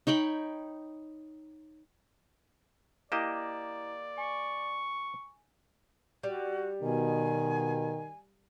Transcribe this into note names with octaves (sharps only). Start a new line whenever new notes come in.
D#4 C#5 G5 B5
A#3 E4 G4 D5 D#5 A#5 E7
G#5 C#6
G3 F#4
B2 D#3 G#5